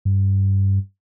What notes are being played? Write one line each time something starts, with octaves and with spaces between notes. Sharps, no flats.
G2